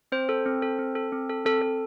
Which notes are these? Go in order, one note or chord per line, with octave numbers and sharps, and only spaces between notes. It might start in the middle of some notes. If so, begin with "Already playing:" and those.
C4 C5
A4
C4
A4
C4
A4
C4
A4
C4 A4
A4